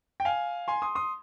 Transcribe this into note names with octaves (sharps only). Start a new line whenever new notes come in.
G5
F5 G#5
G#5 C6
C6 D#6
C6 D#6